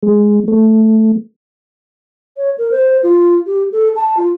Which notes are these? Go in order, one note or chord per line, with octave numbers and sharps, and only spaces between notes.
G#3
A3
C#5
A#4
C5
F4
G4
A4
A5
F4